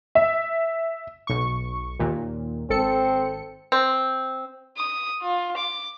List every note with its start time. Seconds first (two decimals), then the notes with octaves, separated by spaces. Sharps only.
0.15 E5
1.27 B1 C#6
1.99 D#2 A#2
2.70 G#1 C4 A4 C#7
3.72 C4
4.78 D#6
5.22 F4
5.57 D6